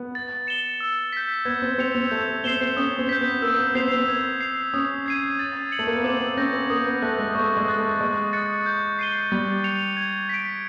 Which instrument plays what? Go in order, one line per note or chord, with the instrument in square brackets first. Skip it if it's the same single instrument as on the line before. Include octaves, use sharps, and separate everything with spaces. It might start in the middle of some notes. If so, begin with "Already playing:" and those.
Already playing: [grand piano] B3
[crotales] A6
C#7 E7 G7
E6
G6 B6
[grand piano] B3 [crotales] G#6
[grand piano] C4
[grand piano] C4 [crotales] C#7 F7
[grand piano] C4
[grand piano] A3 [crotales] G6
[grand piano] C4 [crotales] C7 E7 G7
[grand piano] C4
[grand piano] C#4 [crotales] D#6
[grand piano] C4
[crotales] G6 B6
[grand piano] B3
[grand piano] A#3 [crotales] E6
[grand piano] B3
[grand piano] C4 [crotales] G6 C7 F7
[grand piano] C4
[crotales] G#6
C7 F7
[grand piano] C#4 [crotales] D#6
[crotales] G#6 C7 D#7
A6
C#7 F#7
[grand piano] A3
A#3
B3
[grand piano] C4 [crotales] D6
[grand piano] C4
[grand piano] C#4 [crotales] G6 A#6
[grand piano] B3
[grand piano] A#3 [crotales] D#6
[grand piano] B3
[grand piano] A3 [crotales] F#6 A#6
[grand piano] G#3
[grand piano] A3 [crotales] C#6
[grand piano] G#3
[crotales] F#6 A6
[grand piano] A3
[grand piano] G#3 [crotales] C#6
[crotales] F#6 A6 C#7
G6
C7 D#7 G7
[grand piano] G3 [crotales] A6
[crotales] C#7 F7
G#6
B6 D7